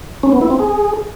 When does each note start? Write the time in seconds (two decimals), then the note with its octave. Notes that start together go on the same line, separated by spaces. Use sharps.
0.23 C#4
0.32 B3
0.41 E4
0.50 C4
0.59 G#4